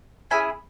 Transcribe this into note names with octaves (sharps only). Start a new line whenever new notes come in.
C#4 E4 G#4 E5 G#5